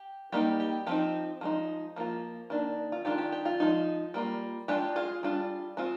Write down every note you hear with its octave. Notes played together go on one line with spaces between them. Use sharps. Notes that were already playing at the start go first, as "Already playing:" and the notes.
Already playing: G4
G3 A#3 D#4 G4
G4
F3 C4 D#4 G4
F3 G#3 D#4
F3 A#3 F4
D#3 A#3 D4
F4
D#3 G#3 D4 F4 G4
G4
G4
F4
F3 G#3 D#4
G3 A#3 F4
G#3 D4 F4 G4
F4 G#4
G3 D4 F4
G#3 C4 F4